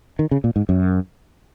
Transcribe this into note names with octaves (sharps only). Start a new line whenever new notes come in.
D#3
C#3
A#2
G#2
F#2